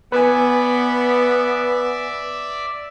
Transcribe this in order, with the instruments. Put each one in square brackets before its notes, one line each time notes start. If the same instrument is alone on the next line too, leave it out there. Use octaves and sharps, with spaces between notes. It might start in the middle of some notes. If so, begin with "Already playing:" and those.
[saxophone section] B3 [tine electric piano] B4 G#5 [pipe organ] D5 E5